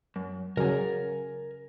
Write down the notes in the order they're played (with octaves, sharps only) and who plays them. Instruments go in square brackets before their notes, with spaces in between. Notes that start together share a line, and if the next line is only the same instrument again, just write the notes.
[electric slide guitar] F#2
[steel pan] C#3 F#3 [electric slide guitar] A#4 G#5